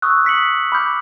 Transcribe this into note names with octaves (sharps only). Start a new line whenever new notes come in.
C#6 D#6 E6 F#6
D#6 B6 C#7 F#7
B5 D6 F6 G6